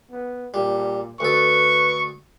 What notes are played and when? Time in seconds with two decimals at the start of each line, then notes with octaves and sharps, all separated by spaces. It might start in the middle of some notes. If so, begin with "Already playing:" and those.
0.11 B3
0.54 A#2 G3
1.20 D2 A4 B4 C#6